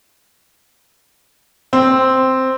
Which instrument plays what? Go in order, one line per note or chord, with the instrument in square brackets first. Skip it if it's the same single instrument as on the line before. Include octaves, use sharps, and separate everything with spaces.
[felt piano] C4